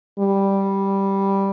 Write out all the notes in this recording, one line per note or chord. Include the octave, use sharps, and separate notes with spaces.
G3